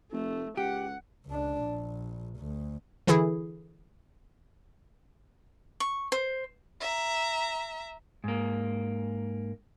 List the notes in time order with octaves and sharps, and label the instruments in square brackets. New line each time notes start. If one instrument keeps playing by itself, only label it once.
[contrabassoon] F1 [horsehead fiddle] A3
[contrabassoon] C#2 [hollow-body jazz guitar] G4 [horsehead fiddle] F#5
[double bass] C#2 D4
A#1
D2
[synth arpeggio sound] D3 E3 E4 G#4
[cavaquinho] C#6
C5
[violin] E5 A#5
[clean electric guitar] G#2 A#3